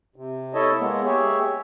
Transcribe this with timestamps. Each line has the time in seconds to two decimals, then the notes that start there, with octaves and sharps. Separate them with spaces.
0.16 C3
0.54 E4 A4 C#5 D#5 E5 A5
0.79 G#3 A#3 B3
1.05 G4 G#4 C#5 E5